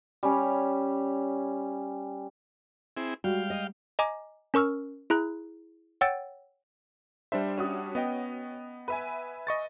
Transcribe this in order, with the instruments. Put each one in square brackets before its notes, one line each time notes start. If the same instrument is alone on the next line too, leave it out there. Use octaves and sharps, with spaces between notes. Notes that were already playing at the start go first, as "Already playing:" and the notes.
[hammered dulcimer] G3 C#4
[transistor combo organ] C4 E4 G#4
[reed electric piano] G3 G#3 [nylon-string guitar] F#4 [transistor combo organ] F5 G5
[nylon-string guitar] D#5
[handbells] D#5 G#5 A#5 D6
C#4 A#4 C#6 E6 F6
E4 G#4 A#5 F#6
C#5 F#5 G5 E6 A6
[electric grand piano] G3 D4 E5 [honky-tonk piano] C5
[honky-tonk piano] C#4 F#4 D#6
[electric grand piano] B3 D#5 G5
[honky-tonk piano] B4 E5 G#5
[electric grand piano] D#5 C#6 A6